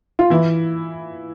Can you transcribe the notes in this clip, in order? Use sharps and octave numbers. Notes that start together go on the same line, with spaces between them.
F4
E3 E4